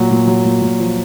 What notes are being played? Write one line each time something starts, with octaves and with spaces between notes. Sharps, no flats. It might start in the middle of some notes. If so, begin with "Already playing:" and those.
Already playing: A#2 F#3
A#2
F#3
A#2
A#2
F3